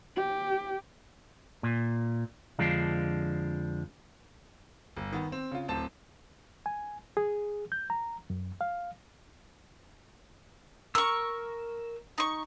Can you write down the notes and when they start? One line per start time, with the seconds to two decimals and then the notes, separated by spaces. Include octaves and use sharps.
0.16 G4
1.63 A#2
2.59 F2 D3 F3 G#3 D4
4.97 G1
5.12 D#3 B3
5.32 C4
5.51 C#3 F4
5.68 D1 C4 A5
6.66 G#5
7.17 G#4
7.72 G6
7.90 A#5
8.30 F#2
8.61 F5
10.95 A#4 C#6 E6
12.18 D#4 C#6